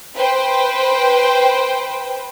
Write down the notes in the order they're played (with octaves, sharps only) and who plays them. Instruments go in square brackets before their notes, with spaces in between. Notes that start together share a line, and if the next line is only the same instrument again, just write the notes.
[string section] B4 C5 G5